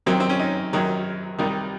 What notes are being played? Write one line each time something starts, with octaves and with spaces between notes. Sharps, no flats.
F#2 D#3 F#3 C4
C4
C#4
D#4
F#2 D#3 F#3
C2 C3 D#3